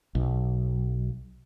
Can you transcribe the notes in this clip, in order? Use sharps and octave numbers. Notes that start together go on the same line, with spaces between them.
B1